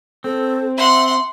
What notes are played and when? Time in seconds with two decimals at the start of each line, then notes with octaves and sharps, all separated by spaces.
0.24 C4 A4
0.77 E5 F#5 C6